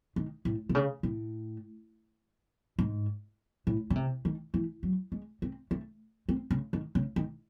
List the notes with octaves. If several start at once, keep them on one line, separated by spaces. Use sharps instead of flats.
D#3
A2
C3
C#3
A2
G#2
A2
C#3
C3
D#3
E3
F#3
G#3
C4
A3
C4
C#3
D#3
C#3
D#3